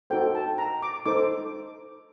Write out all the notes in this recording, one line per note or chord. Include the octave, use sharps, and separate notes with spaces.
D#4 F#4 A4 C5 G5
A5
A#5
D6
D#4 A4 C5 D6